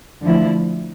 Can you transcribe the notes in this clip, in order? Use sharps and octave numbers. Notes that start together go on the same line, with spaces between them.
D3 F3 A3 E4